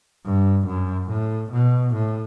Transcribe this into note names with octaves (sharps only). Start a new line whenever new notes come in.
G2
F#2
A2
B2
A2